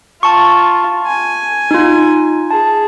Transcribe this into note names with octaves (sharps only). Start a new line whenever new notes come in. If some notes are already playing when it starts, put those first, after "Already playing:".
F4 A5 C#6
G#5
D#4 F4
G#4 A5